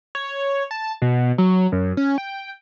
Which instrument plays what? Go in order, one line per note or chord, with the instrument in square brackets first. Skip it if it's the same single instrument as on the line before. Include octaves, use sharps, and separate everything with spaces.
[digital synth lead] C#5
A5
B2
F#3
F#2
C#4
G5